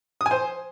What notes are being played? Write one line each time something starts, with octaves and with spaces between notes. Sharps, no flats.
D#6
G#5
C5